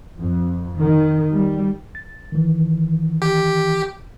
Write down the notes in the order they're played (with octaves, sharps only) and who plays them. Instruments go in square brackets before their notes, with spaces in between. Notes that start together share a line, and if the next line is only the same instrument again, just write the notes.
[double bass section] F2
D#3
G3
[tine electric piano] A6
D#3 E3
[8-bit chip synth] G4